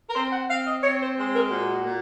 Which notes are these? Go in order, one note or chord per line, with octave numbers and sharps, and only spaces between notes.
A#4
C4 C5
F#5
C4 F5
D#5
C4 C#5
C5
G#3 C5
A#4
A#2 F#4
A#2